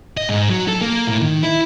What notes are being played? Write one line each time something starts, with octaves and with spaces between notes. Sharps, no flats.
D#5
G#2
F#3
A4
A#3
A2
D#3
E4